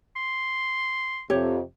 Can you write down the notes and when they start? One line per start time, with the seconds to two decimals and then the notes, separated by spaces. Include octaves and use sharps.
0.16 C6
1.30 F2 C3 G4 C#5